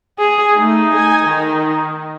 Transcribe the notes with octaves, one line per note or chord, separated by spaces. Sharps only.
G#4
A3 D#4
G#5
D#3